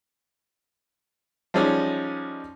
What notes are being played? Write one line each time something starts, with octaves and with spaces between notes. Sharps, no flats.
F3 G3 G#3 C#4 D#4